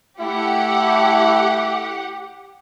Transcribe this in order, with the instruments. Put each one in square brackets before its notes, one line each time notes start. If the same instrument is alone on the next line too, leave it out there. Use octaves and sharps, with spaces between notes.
[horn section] A3 E4 [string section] G4 F#5